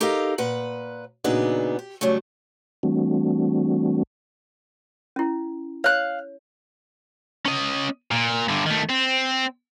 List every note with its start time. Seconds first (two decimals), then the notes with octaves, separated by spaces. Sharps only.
0.01 D#4 G4 A4 A#4 D#5 F5
0.38 A#2 B4 F#5
1.24 A#2 C#3 F#3 B3 D4 D#4
1.79 G4
2.01 C#3 F#3 G3 A3
2.83 E3 G3 A3 C4 D4 F#4
5.16 C#4 E4
5.84 C#5 F5 F#6
7.46 C#4 D#5
8.11 A#2
8.49 G2 D3
8.66 D#3 A3
8.90 C4